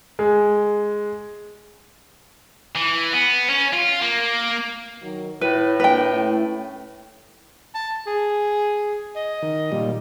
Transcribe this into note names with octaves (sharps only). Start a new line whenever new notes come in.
G#3
E3
B3
C#4
F4
A#3
D#3 F#3
A2 E4 B4
D3 A#3 B4 G5
A3 C#4 E4
A5
G#4
D#5
D#3
A#2 G3